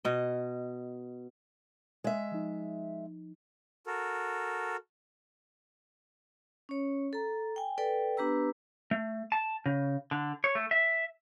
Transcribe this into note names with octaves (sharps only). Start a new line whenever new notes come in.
B2 D#5
G#3 E5
F3 D#4
F#4 A4 A#4
C#4 C#5
A4 A#5
G5 G#5
A4 B4 D5 G5
B3 D4 G4 B4 A#5 E6
A3
A5
C#3
D3
C#5
A3
E5